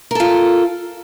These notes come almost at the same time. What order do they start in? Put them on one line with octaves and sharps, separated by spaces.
A#4 A4 F4